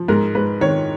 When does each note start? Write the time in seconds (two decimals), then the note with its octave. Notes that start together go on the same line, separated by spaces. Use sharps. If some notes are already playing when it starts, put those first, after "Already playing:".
Already playing: F3
0.08 G#2 A#4
0.35 G#2 B4
0.61 D#3 C#5